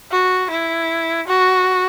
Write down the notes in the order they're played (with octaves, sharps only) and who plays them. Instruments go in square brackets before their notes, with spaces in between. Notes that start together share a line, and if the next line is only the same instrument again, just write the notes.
[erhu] F#4
E4
F#4